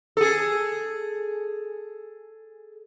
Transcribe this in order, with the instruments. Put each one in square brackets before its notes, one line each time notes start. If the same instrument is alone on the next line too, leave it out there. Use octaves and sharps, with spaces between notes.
[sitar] G#4 A4